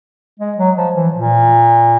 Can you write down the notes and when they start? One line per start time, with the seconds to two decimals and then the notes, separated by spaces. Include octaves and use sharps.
0.40 G#3
0.58 F#3
0.76 F3
0.95 E3
1.13 A#2